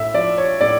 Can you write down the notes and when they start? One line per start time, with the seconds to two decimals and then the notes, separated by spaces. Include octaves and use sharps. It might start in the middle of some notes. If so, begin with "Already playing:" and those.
Already playing: A2 E5
0.14 F3 D5
0.38 C#5
0.61 A2 D5